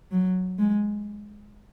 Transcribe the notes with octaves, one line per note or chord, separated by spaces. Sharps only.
F#3
G#3